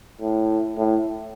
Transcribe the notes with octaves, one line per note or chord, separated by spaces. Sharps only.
A2
A2